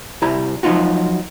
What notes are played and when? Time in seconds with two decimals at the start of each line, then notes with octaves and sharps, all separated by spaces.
0.22 C2 G3 E4 A#5
0.63 F3 F#3 A3 D#4 F4 F#4